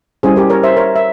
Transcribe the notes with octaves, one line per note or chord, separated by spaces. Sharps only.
G3 C#4 E4 G4 G#4 C5
G4 A#4
A#4 C#5
C5 E5
A#4 C#5
E5